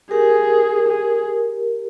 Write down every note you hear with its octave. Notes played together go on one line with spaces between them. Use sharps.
G4 G#4 A#4
G#4